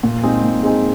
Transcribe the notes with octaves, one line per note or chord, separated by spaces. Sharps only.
A#2
G#3 C4 D#4 G#4
A#2
G#3 C4 D#4 G#4